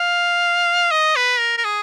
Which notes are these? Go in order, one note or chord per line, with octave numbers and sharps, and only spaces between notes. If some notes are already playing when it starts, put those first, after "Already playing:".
Already playing: F5
D#5
B4
A#4
A#4
G#4